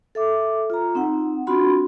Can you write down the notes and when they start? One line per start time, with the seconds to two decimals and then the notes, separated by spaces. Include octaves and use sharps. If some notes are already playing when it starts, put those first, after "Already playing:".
0.15 A4 E5 D6
0.70 F4 A#5
0.95 C4 D#4 F#5
1.47 C4 D4 F4 F#4 B5 C6